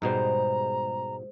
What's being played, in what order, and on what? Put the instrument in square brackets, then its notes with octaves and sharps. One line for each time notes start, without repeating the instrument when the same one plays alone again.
[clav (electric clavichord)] G#2 B2 G3 [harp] G#3 C5 [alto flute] A#5